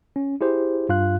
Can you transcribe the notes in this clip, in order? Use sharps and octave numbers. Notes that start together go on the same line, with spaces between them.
C#4
E4 G4 G#4 C5
G2 F4 F5 F#6